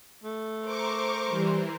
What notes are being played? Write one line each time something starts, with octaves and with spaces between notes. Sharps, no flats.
A3
A#4 C5 C#6 D6
E3 G3